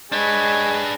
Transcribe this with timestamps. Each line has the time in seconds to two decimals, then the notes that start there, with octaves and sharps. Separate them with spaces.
0.12 G#3 D4 B4 C#5